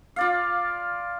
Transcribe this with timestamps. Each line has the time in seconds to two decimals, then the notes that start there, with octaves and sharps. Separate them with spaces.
0.16 F4 D5 F5